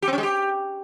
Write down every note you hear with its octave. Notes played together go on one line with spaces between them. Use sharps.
G4
C4
C#4
G#3
G4